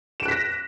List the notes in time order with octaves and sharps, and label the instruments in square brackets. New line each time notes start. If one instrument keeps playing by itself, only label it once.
[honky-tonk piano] E7
D7
F#6
B6
A#6